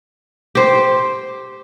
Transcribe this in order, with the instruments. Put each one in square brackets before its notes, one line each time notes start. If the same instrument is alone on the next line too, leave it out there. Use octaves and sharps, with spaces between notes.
[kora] G4 C5